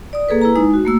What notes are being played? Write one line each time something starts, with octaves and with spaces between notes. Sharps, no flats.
D5 D#6
A#3 G#4 A4 B4
E4 B4 A#5
G#3 D#4 D#6
F#4
A3 A#3 E6